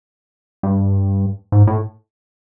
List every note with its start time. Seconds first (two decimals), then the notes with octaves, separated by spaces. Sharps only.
0.63 G2
1.52 G#2
1.67 A2